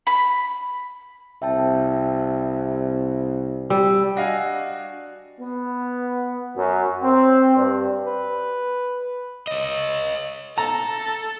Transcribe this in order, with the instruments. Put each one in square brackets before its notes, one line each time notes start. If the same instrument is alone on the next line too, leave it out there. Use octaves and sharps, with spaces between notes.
[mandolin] B5
[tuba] C2 [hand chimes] E5 G5 A5
[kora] G3 [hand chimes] E6
[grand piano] D4 F#4 D#5 F5 G#5
[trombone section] B3
F#2
C4
G2
[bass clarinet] B4
[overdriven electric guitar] C#5 D#5
[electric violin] A4 [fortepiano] A#5